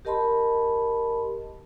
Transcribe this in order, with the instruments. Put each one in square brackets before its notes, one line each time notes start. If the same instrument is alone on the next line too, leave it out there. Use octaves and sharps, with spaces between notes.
[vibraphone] G4 A#4 D#5 A5 B5 C6